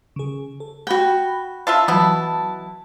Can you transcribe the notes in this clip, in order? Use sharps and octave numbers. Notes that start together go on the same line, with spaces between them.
C#3 G#4
A4
F#4 F#5 G5 B5
D4 F4 E5 A5
B2 E3 F#3 B3 E4